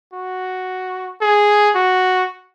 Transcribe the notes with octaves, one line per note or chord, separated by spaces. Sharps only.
F#4
G#4
F#4